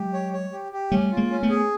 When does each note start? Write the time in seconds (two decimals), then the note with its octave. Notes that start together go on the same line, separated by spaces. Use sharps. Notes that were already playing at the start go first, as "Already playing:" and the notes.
Already playing: F#3 G#3 G4
0.13 C#5
0.33 C#5
0.52 G4
0.72 G4
0.91 G3 A3 C#4
1.12 F4
1.17 G#3 A#3
1.30 C#4
1.43 A3 B3
1.49 G#4